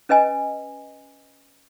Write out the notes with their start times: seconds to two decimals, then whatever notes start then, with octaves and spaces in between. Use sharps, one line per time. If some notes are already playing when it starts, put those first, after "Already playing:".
0.09 C#4 B4 D#5 G#5